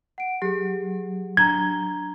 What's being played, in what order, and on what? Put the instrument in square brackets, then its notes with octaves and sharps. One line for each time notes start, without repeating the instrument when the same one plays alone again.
[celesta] F#5 D7
[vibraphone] F#3 [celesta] G4 G#4
[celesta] D4 A#5 G7 [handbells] G#6